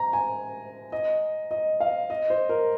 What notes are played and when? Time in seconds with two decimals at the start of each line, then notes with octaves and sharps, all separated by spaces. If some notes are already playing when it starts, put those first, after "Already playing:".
Already playing: A#5
0.13 G#5
0.92 D#5
1.51 D#5
1.80 F5
2.10 D#5
2.30 C5
2.49 A#4